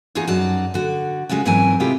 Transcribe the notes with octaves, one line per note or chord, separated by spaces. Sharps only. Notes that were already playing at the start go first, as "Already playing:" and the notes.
E2 D#4 F4 F#4 G#4
F#2 D#4 F#4 D5 A5
D3 F#4
C#3 G#3 C#4 F4 F#4
G#2 E3 F#3 C4 A#4 G#5
C3 G#3 A3 E4 F4 G4